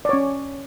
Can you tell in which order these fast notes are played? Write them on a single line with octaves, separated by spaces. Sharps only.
D5 C#5 C#4